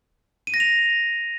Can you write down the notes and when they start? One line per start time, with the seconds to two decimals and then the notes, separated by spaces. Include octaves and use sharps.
0.47 D#7
0.54 A#6
0.60 F7